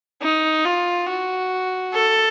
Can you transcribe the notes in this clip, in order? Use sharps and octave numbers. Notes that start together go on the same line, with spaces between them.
D#4
F4
F#4
A4